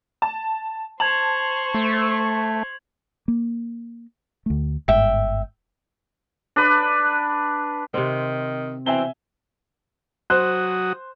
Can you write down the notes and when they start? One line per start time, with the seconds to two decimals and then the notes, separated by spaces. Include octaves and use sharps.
0.22 A5
1.00 C5 A5 C#6 G#6 F7 F#7
1.74 A3
3.28 A#3
4.46 D2 A3
4.88 G1 G#2 E5 G5
6.56 D4 B4
7.94 C3 D#3 C4
8.86 B2 E3 C4 E5 G#5 G7
10.30 F#3 F#4 C5 D#6 F#6